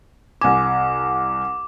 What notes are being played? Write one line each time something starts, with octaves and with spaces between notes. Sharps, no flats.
C2 G#5 D6